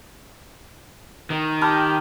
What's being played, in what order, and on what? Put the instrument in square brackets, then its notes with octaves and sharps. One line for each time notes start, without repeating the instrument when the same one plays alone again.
[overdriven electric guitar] D#3
[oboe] G4 [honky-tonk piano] A5 B5 F6